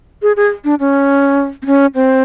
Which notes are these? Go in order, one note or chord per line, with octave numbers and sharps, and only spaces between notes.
G#4
G#4
D4
C#4
C4
C#4
C4